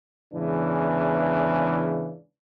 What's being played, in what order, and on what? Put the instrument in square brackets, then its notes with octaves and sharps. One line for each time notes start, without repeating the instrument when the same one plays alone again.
[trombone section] E2 G#2 C#3 E3 D4